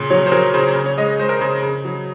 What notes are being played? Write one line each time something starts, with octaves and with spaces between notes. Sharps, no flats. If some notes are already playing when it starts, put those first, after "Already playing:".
Already playing: A#2 C#3
F#3 C#5
C5
F#3 A#4
C#3 C5
C#3
C#5
G#3 D#5
G#3 C5
A#4
C#3 C5
C#3
F#3